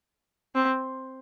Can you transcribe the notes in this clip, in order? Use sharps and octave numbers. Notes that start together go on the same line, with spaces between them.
C4